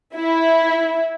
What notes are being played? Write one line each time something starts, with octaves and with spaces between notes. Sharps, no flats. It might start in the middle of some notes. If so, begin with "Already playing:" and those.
E4